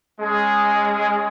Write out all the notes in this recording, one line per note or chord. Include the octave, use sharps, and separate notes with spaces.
G#3 C#4 G#4